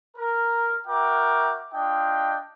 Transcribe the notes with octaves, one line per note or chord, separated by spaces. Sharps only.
A#4
F#4 A#4 E5 G5 D6
D4 F4 D#5 G5